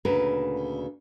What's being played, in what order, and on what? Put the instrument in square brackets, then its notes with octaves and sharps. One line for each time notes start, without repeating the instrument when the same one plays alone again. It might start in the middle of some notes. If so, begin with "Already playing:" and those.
[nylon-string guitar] D2 A#2 C#3 A#4 B4